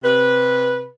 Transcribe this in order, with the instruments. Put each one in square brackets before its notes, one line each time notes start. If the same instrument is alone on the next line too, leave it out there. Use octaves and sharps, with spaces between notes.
[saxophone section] C3 B4